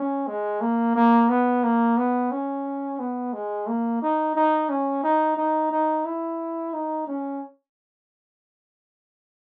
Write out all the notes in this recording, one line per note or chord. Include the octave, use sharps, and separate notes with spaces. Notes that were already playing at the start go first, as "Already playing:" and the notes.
Already playing: C#4
G#3
A#3
A#3
B3
A#3
B3
C#4
B3
G#3
A#3
D#4
D#4
C#4
D#4
D#4
D#4
E4
D#4
C#4